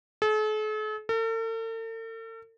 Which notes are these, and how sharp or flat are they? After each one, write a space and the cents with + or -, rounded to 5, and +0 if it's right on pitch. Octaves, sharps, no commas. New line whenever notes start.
A4 -45
A4 +45